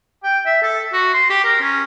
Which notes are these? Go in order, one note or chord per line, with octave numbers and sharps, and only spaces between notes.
G5
E5
A4
F#4
C6
G4
A#4
C#4